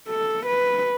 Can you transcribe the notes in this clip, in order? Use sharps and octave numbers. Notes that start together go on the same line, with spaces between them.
A4
B4